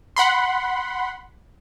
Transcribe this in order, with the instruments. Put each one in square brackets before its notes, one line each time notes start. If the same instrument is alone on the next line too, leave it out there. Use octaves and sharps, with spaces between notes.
[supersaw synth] F#5 B5 C6